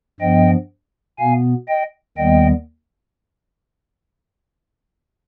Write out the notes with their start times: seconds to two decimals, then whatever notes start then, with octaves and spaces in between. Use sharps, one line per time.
0.20 G2 F3 B3 D#5 G5
1.19 B2 B3 F5 G#5
1.68 D#5 G5
2.18 D#2 D#3 G3 B3 D#5 G5